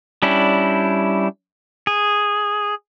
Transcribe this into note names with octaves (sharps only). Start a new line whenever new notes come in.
G3 C#4 D4 E4
G#4